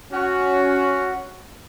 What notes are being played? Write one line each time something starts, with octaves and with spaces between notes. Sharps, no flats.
C#4 F#4